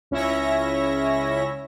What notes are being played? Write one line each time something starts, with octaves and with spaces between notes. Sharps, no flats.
C#2 C#4 E4 C#5 E5 A#6